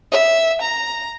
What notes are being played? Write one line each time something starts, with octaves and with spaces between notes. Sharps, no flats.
E5
A#5